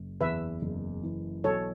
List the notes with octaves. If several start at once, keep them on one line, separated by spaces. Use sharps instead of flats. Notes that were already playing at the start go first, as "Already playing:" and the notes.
Already playing: F#1
E2 B4 E5
F#1
E3
B1 A4 C#5